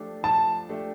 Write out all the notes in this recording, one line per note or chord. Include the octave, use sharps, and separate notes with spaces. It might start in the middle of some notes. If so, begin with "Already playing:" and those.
Already playing: F3 A3 D4 G4
F3 A5
A3 D4 G4